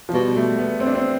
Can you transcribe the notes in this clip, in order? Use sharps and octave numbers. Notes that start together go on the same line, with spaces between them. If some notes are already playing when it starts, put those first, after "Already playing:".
F3
B2 G3
A3
B3
C4
D4
C4